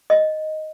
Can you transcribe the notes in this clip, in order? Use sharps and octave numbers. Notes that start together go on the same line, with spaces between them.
D#5